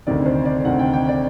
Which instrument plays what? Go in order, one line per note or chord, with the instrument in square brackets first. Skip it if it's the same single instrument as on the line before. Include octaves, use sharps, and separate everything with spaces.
[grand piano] D2 C3 D#3 D5
C5
D5
D2 C3 D#3 F#5
G5
G5
D5